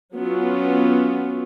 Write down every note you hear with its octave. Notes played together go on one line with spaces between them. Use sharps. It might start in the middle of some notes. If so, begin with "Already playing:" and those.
F#3 B3 C#4 F4